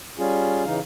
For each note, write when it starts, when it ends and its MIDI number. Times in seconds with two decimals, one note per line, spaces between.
0.18 0.64 55
0.18 0.64 61
0.18 0.64 65
0.18 0.64 68
0.65 0.79 49
0.65 0.79 52
0.65 0.79 63
0.65 0.79 77